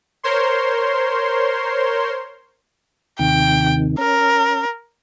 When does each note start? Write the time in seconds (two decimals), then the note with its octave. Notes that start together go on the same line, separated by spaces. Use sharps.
0.23 A#4 C5 C#5 C6
3.19 D#2 C3 D#3 G5
3.98 C#4 A#4